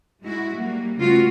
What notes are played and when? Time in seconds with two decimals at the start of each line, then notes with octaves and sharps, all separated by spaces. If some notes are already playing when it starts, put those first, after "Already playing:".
0.22 G#3 E4 F#4
0.55 G3 A#3
0.97 C#3 A3 B3 F4 F#4